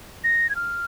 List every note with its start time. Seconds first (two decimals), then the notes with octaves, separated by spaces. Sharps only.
0.24 A#6
0.50 G#6
0.56 F6